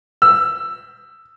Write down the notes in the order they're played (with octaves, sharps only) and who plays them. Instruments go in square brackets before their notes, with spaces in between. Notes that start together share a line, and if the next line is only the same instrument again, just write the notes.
[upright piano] E6